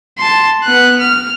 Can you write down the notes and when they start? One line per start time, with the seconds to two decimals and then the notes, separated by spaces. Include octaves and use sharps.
0.18 A5 C6
0.64 B3 F#6
1.00 F6